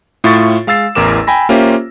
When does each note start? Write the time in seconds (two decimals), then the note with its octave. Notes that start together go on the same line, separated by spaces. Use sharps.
0.24 A2 F4 E5 C#6 A6
0.67 G#3 F5 E6 A6 C7
0.95 A1 E2 A#4 D6 E7
1.27 G5 G#5 B5 A#6
1.49 A#3 C#4 F4 G4 C5 E5